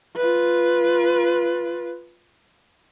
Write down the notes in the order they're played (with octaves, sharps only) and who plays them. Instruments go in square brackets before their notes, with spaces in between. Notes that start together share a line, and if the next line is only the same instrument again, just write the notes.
[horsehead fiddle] F4 B4